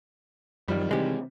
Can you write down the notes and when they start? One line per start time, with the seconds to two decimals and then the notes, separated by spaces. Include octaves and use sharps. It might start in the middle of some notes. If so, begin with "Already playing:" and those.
0.68 F#2 D#3 F3 G3
0.91 C3 E3 G#3 C4 G4